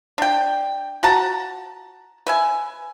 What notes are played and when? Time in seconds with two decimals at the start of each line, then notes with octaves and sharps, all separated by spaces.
0.18 D4 G5
1.03 F#4 F#5 A5 A#5
2.27 B4 E5 G#5